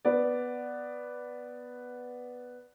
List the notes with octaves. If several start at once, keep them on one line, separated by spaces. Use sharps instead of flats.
B3 D5